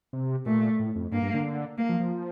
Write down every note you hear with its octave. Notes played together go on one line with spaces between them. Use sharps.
C3
A#2 A3
A2
F2
G2 A#3
G2
D3
A#3
F3
F3